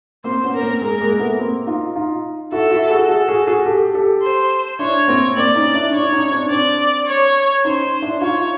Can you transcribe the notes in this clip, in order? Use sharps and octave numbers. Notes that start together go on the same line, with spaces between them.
A#3 C4 C5
B3 C#4
A#4
A#3 C4
G#3 A#3 A#4
G#3 A#3
A3 B3
A#3 C4
D#4 F4
D#4 F4
E4 F#4 A4
E4 F#4
F#4 G#4
F#4 G#4 A4
F#4 G#4
F#4 G#4
G4 A4
G4 A4
C5
D4 E4 C#5
A#3 C4
A#3 C4 D5
C#4 D#4
D4 E4
D4 E4 C#5
D4
C#4 D#4
C4 D4
C4 D4 D5
C#5
C#4 D#4 C5
D4 E4
D#4 F4 C#5